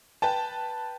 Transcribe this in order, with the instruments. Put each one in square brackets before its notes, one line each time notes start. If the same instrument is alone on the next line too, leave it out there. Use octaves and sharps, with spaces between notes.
[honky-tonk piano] B4 G5 A5